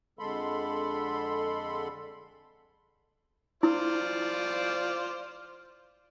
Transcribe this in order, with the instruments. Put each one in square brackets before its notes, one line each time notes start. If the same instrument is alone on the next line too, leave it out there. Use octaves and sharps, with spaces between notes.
[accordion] F2 D3 G#3 A4 B5 C6
[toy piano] E4 [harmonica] F4 C5 D5